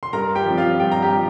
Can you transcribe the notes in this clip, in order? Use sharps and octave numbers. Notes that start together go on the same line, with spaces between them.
C6
G2 A#4 A#5
G4 G5
F3 C4
F4 F5
G2 G5
A#5
G4 G5
F3